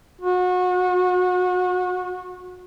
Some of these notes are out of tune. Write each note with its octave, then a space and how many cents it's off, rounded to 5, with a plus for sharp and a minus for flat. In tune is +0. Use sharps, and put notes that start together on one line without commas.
F#4 -30